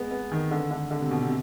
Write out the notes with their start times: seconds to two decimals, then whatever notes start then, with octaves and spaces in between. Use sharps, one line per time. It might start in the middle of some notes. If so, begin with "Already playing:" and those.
Already playing: G#3 B3
0.11 B3
0.32 D#3
0.51 D3
0.71 D3
0.91 D3
1.01 C3
1.11 B2
1.21 C3